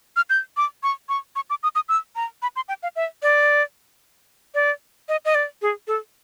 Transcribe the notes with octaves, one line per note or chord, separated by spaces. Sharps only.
F6
G6
D6
C#6
C#6
C#6
D6
D#6
D#6
E6
A#5
B5
C6
G5
F5
E5
D5
D5
D#5
D#5
D5
G#4
A4